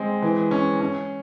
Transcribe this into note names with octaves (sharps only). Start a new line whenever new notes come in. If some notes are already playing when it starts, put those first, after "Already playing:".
Already playing: G#3 C4
E3
C#4
C#4